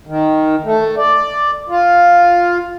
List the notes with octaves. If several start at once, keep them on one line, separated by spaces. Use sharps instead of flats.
D#3
A3
D5
F4